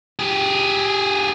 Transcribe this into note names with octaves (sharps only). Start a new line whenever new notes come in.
G4 G#4